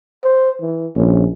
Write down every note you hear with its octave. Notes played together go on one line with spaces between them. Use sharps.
C5
E3
A#1 C#4